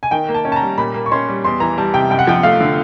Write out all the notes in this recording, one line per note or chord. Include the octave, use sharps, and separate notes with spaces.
G#5
D#3 G5
A#3
A5
C#4
A5
A#5
G3
A#2 B5
A#3
C#6
C#4 C6
G3
E2 C6
E3 A#5
G3 A5
C3 G5
F#2 G5
F#5
F3 G5
A3 F5
D3